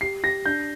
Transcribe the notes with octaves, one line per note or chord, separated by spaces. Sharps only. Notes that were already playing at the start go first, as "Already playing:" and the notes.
G4 C7
G4 A#6
D4 G6